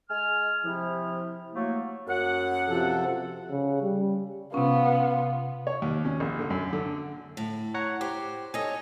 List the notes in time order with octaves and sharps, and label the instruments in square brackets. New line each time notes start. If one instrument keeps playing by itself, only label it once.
[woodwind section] G#3 G#5 F6
C3 F3 E4
F#3 A3 A#3
F#2 F#5
[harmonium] C3 F3 A4
[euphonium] C#3
G3
[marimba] C3 C#4 [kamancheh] B3 F4
[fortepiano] C#5
D#2
C#4
A#1
D3
F#2
D3
[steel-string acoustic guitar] A2
[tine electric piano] C#5 F#5 A#5
[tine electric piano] G4 [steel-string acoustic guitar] C5
[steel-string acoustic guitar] D#4 C#5 [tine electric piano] A4 D#5 G#5